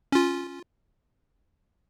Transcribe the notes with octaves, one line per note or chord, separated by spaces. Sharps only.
C#4 F4